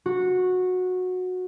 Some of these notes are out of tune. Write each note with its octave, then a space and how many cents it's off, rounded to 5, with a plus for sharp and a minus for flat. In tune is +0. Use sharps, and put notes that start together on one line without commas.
F#4 -15